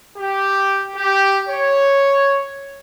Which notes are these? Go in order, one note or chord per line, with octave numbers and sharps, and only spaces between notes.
G4
G4
C#5